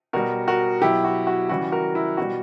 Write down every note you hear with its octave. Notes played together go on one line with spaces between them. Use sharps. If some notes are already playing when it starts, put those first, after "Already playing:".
B2 G3 F#4 A#4
F#4 A#4
B2 F#3 E4 G4
F#4
F#4
C#3 E3 G3 F#4
F#4 A#4
E4
B2 G3 F#4